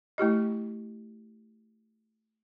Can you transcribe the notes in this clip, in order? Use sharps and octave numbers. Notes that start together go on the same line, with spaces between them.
A3 E4 G4 D#5